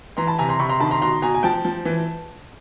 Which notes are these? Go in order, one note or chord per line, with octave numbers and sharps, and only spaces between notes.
E3 A#5 C6
A5 B5
C3 G#5 A#5
A#5 C6
C3 B5 C#6
A#5 C6
D#3 A5 B5
A#5 C6
B2 A#5 C6
B2 G#5 A#5
G#5
F3 G5 A5
F3
E3